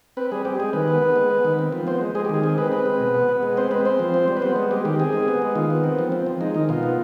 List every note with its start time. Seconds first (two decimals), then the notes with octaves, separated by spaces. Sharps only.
0.17 C4 B4
0.32 G3 G#4
0.45 C4 G4
0.60 G#3 G#4
0.73 D#3 B4
0.88 B3
1.02 B3
1.16 G#3
1.31 B3
1.45 D#3
1.59 C4
1.72 F3
1.87 B3 C5
2.01 G#3
2.15 G#3 G#4
2.25 G4
2.29 D#3 G#4
2.43 C4 G#4
2.58 G#3 B4
2.72 C4 B4
2.86 G#3
3.00 B2
3.14 B3
3.29 B3
3.43 G#3
3.57 C4 C5
3.71 G#3 B4
3.85 C4 C5
3.99 F3
4.14 C4
4.28 G3
4.37 B4
4.42 B3 C5
4.56 G#3
4.71 G#3 G4
4.85 D#3 G4
4.99 C4 G#4
5.13 G#3
5.28 B3
5.42 G#3
5.55 D#3 F4
5.70 B3
5.84 C4
5.99 F3
6.12 C4
6.26 F3
6.41 G#3 D#4
6.55 D#3 D#4
6.69 B2 F4
6.83 B3